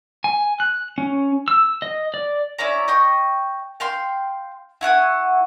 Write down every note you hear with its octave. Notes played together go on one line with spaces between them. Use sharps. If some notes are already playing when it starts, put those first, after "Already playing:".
G#5
F#6
C#4
E6
D#5
D5
C#4 E4 D5 A#5
D#5 G5 C#6
F5 G5 C6
E4 F#4 F#5 G#5